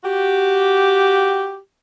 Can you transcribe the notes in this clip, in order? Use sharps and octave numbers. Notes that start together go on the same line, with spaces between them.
F#4 G4